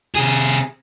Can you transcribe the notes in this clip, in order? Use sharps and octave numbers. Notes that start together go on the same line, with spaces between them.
C3 G#4